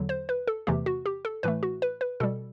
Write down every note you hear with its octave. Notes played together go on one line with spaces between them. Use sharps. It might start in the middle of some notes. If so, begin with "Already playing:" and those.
Already playing: E2 D3 F#3
C5
B4
A4
E2 C3 E3 A3 G4
F#4
G4
A4
A2 E3 A3 B4
F#4
B4
B4
B2 G3 A4